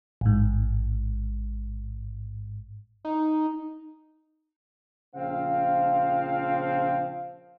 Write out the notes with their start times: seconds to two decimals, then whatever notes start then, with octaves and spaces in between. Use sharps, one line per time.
0.21 A1 G#2
3.05 D#4
5.15 A#1 C#3 F3 C4 F5